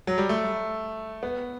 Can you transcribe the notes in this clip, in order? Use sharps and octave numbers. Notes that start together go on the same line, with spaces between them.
F#3
G3
A3
B3